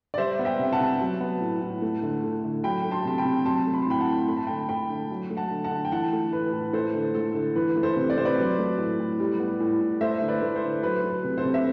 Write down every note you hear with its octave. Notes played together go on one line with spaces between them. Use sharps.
D5
G3 C5 E5
B3
E5 G5
C3
F#5 A5
C3
F#3
B3
A2
A2
A3
D3
A3
D3
F#3 G5 B5
A3
A5 C6
C3 A5
G5 B5
C3
F#3 A5 C6
A3
B5
C6
A2 G5 B5
F#5 A5
A2
A3 B5
A5
D3 G5 B5
A3 G5 B5
D3
F#3
A3
F#5 A5
D3
F#5 A5
D3
G5
E3 F#5 A5
A3
A2 B4
A2
A3 A4 C5
D3
A3 A4
D3
E3 B4
A3
A4 C5
C3
D5
C3 C5
B4 D5
F#3
A3
A2
A2
G3
B3
A2
A2
A3 C5 E5
D3
B4 D5
A3
A4 C5
D3
F#3 B4
A3
B4
C3
A4 C5
C3
E5